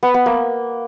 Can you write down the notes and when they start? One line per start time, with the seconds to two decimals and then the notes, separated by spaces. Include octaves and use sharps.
0.03 B3
0.14 B3
0.26 A#3